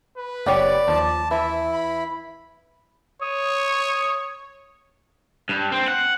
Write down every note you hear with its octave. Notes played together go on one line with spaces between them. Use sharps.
B4
F#1 B3 G4 C#5 D5
D#2 F3 A5
E3 E4 E5
B5
C#5 D#6
G2
C4
F#5